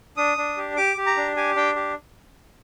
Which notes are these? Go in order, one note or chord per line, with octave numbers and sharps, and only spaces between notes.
D4 D#6
D4
G4
G4 D6
G4
A#5
D4
G4 G#5
D4 G5
G4